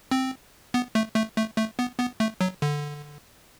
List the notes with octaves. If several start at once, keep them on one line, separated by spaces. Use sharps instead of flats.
C4
B3
A3
A3
A3
A3
B3
B3
A3
F#3
D3